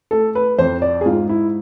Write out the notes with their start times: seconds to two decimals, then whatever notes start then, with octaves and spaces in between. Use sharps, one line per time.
0.11 A3 A4
0.35 B4
0.59 F2 C5
0.82 D5
1.01 G#4
1.05 G#2 F4
1.29 E4